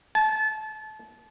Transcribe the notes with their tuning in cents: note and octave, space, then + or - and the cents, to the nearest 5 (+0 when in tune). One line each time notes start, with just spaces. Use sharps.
A5 -30